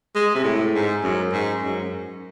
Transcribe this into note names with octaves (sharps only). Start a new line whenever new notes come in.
G#3
C3
A2
G#2
F#2
G#2
F#2